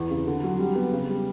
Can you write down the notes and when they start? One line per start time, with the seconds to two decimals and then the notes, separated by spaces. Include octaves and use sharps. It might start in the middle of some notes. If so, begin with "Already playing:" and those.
Already playing: E2
0.10 C#3
0.27 D3
0.44 F#3
0.59 G3
0.75 B3
0.93 C#3
1.09 G3